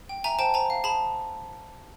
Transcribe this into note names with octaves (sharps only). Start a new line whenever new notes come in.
G5
E5 G#5 A#5
C5 G5 A5
C5 G#5 A#5
F5
G#4 A5 B5